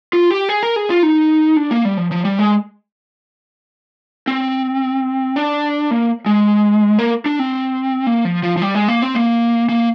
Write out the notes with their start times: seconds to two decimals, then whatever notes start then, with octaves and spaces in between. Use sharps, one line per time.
0.13 F4
0.31 G4
0.49 G#4
0.63 A#4
0.76 G#4
0.90 F4
1.03 D#4
1.57 D4
1.71 A#3
1.85 G3
1.97 F3
2.11 F3
2.25 G3
2.39 G#3
4.27 C4
5.36 D4
5.91 A#3
6.26 G#3
6.99 A#3
7.26 D4
7.39 C4
8.07 A#3
8.25 F3
8.43 F3
8.57 F3
8.62 G3
8.75 G#3
8.88 A#3
9.02 C4
9.15 A#3
9.69 A#3